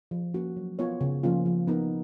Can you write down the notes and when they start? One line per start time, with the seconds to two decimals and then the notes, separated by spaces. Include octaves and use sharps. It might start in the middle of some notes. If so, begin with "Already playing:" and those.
0.11 F3
0.34 A#3 C#4 F#4
0.57 F#3
0.78 B3 F4 A#4 C#5
1.01 C#3
1.23 F3 A#3 C#4 F4
1.46 F3
1.68 B3 D#4 A#4